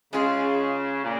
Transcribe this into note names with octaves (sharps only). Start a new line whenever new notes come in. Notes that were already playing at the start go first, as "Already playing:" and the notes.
C#3 G#3 C#4 F4 G#4
A#2